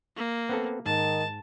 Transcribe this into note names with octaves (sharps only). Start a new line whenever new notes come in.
A#3
B3 C4 A4
G#2 D#3 A5